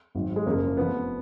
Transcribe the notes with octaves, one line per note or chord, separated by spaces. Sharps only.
G#1 G#2 F#3
G#3
F#1 F#2 F3 A#3
F1 F2 F3 B3